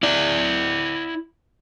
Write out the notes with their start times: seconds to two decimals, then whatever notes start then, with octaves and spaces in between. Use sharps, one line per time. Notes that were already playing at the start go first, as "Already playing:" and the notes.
0.03 E4 D5